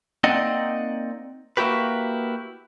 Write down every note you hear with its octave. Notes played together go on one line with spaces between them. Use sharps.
A#3 C4 D#4 D5 D#5 F#5
A#3 E4 F#4 G4 B4